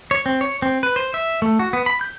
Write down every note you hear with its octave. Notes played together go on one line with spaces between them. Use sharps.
C#5
C4
C#5
C4
B4
C5
E5
A3
F#4
B3
B5
G6